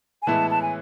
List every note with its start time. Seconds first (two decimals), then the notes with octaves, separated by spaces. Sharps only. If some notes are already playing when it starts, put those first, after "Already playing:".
0.22 G#5
0.27 A2 E3 G#3 B3 E4 A5
0.51 A5
0.62 G#5